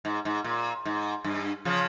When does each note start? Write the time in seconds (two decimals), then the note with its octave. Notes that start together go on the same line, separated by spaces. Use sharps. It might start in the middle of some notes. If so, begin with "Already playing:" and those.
0.05 G#2
0.25 G#2
0.44 A#2
0.85 G#2
1.24 G2
1.65 C#3 F3